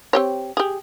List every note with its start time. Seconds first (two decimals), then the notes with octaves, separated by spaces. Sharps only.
0.13 C4 G4 C#5
0.57 G4 G#4